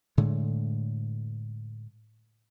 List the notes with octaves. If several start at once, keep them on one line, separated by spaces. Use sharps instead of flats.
A2 D3 G#3 A3